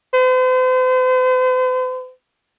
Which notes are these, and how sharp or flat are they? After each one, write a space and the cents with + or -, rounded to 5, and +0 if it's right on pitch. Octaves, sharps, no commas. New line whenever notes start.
C5 -45